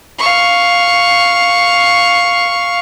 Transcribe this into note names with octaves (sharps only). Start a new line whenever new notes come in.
F5 C#6